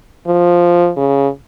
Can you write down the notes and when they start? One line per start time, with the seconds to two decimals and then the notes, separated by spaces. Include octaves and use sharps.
0.27 F3
0.97 C#3